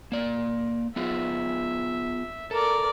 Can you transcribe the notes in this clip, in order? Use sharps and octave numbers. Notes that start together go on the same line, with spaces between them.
A#3 D5
B3 F4 G#4 E5
A4 A#4 D5